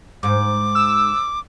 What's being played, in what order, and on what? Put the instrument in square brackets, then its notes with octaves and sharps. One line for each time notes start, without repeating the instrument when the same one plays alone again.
[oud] G#2 [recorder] D6
[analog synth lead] E6